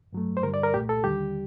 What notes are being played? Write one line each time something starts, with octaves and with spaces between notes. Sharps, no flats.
G2 F#3 A3
C5
G2 D3 G3 A#4
D5
A#4
C2 A#2 A3 G4
A4
D#2 D3 G3 G4